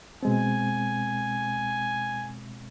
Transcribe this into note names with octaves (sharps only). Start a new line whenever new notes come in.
B2 G#3 C4 G#5